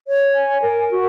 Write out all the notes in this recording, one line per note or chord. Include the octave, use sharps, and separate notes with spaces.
C#5
G#5
A#4
F#4